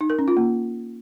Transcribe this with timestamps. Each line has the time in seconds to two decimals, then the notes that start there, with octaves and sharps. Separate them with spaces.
0.01 D#4
0.10 A#4
0.19 C#4
0.28 F4
0.37 A#3